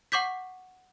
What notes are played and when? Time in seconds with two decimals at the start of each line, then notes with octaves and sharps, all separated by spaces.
0.12 F#5 C#6 D6 G6 B6